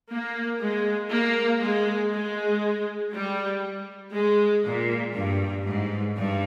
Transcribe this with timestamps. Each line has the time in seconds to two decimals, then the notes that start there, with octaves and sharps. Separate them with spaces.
0.10 A#3
0.60 G#3
1.11 A#3
1.61 G#3
2.12 G#3
3.13 G3
4.13 G#3
4.64 A#2
5.15 G2
5.65 G#2
6.16 G2